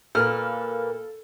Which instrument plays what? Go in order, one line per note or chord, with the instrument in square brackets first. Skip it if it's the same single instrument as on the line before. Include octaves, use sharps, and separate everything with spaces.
[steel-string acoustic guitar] A#2 A#3 B4 [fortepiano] A4 F6